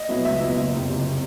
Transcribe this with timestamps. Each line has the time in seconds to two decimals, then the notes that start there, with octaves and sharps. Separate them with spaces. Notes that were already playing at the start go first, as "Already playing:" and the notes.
Already playing: D#5
0.09 B2 F#3 B3 E4
0.25 C#2 E5
0.41 B2 F#3 B3 E4
0.56 F#1
0.73 E2 C3
0.88 F#1
1.08 C3